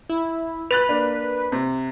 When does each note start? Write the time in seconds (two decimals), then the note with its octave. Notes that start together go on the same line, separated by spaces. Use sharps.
0.09 E4
0.71 B4 F#6 A6 F7
0.89 A#3 D4
1.52 C3